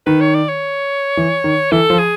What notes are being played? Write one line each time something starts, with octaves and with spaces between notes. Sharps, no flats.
D#3 B4
C#5
D5
C#5
E3
D#3
E3 A4
F3
G#4